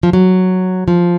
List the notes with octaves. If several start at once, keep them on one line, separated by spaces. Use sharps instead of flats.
F3
F#3
F3